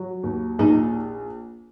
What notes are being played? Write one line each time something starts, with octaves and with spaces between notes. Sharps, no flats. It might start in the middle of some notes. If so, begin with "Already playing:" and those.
Already playing: F#3
D#2
A#1 D#4